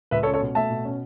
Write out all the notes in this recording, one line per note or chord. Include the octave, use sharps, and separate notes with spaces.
C#2 B4 E5
A4 C#5
C#4
A4 C#5
B2
A3 E5 A5
B2
C#4